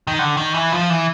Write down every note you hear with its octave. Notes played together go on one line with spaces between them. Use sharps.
D#3
D3
D#3
E3
F3
E3